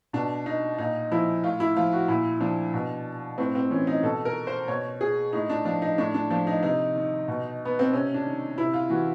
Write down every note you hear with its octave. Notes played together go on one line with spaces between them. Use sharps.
B2 D4
D#4
A#2 D#4
F3 E4
A2 F4
E4
F3 F4
F#4
A#2 E4
F3 D4
B2
A2 C4
C4
E3 C#4
D#4
B2 A4
A#4
C5
B2 C#5
G#4
A2 D#4
D4
F3 D4
D#4
A2 D4
D4
F3 D4
D#4
C3 D#4
D#3
B2
B3
C4
C3 C#4
D4
D#3
C3 E4
F4
E3 F#4